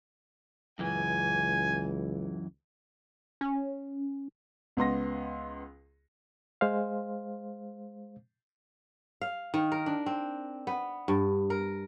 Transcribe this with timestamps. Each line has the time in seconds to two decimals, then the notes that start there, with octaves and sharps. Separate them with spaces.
0.79 C#2 F#2 E3 G#5
3.41 C#4
4.77 C#2 B3 C6 A#6
6.61 G#3 C5 F5
9.21 F5
9.54 D#3
9.72 A#4
9.86 D4
10.06 C4
10.67 B3
11.08 G2
11.50 A#4